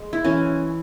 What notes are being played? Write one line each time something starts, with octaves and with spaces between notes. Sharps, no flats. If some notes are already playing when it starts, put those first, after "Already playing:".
Already playing: G#3
E4
E3 C#4